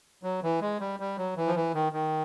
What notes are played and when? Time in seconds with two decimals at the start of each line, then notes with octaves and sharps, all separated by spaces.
0.23 F#3
0.43 E3
0.61 G#3
0.80 G3
1.00 G3
1.17 F#3
1.36 E3
1.48 F3
1.55 E3
1.74 D#3
1.92 D#3